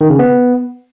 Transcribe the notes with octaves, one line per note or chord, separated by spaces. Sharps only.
D#3
C#3
B3